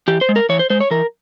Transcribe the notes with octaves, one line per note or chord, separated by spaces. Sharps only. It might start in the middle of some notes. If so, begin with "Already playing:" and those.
E3 G4
C5
G#3
A#4
E3 C#5
C5
G#3 C5
C#5
E3 A#4